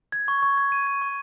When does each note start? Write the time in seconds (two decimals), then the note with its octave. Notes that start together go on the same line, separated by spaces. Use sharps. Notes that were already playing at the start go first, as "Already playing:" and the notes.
0.12 G#6
0.28 C#6
0.43 C#6
0.57 G#6
0.72 D#7
0.87 G#6
1.02 C#6